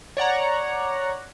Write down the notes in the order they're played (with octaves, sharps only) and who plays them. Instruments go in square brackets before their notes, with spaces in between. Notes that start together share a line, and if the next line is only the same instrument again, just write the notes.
[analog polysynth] C#5 D5 F#5 A#5